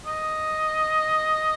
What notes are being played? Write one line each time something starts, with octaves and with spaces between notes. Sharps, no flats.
D#5